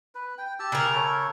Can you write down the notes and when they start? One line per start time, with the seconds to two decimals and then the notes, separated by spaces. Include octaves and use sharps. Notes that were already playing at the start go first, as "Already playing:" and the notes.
0.15 B4
0.38 G5
0.60 G4 A5 E6
0.72 C#3 A#4
0.96 A4 C#5